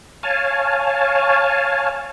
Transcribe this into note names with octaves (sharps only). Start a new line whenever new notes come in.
C#5 F5 G#5 A5